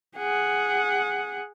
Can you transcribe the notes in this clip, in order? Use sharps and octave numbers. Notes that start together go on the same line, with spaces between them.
G#4 F#5